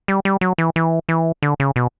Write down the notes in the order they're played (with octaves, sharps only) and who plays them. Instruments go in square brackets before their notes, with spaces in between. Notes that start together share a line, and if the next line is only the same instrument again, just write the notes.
[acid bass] G3
G3
F#3
E3
E3
E3
D3
C#3
B2